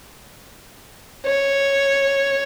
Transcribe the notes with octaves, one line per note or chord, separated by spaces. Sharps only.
C#5